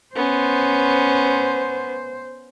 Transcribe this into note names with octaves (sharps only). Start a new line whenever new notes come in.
B3 C#4 C5